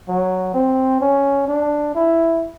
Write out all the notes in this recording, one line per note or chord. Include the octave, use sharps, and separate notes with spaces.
F#3
C4
C#4
D4
E4